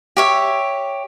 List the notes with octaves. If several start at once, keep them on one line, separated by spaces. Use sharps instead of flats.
G4 C#5 E5